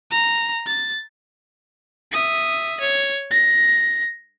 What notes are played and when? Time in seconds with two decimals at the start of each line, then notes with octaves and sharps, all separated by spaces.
0.11 A#5
0.67 A6
2.12 E5 D#6
2.80 C#5
3.31 A#6